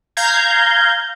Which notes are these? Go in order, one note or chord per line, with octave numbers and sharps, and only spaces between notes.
F5 A#5 G6 G#6